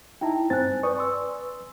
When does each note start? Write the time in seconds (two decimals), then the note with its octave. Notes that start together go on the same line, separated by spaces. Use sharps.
0.21 D#4 E4 G5 A5 A#5
0.50 G2 C4 C5 G#5 F#6 A6
0.83 B4 D5 C#6 D#6
0.96 G#5 C6 E6